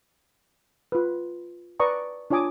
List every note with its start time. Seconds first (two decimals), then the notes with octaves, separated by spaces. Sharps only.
0.92 F4 B4
1.80 B4 D5 A#5 C#6 D#6
2.30 D4 F4 C#5 G#5 D6 D#6